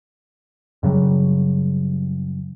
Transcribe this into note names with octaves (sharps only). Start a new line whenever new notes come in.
F#2 C#3 F#3 G3